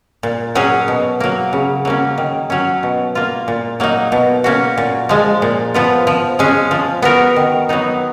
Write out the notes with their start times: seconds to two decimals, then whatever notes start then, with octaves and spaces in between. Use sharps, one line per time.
0.23 A#2
0.55 F#3 C#4 G#4
0.88 B2
1.20 F#3 A#3
1.53 C#3
1.85 F#3 A#3 C#4
2.18 D#3
2.50 F#3 C#4
2.83 B2
3.15 A#3 F4
3.48 A#2
3.80 F#3 A#3 D#4
4.12 B2
4.44 A#3 C#4 F#4
4.78 A#2
5.09 F3 G#3
5.42 A#2
5.74 F3 B3 F4
6.07 F3
6.39 G#3 C#4 G#4
6.71 F3
7.02 B3 F#4 A#4
7.36 D#3
7.69 F#3 B3 D#4